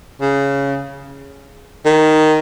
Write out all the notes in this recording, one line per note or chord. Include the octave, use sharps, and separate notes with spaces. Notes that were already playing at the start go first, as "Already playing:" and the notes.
C#3
D#3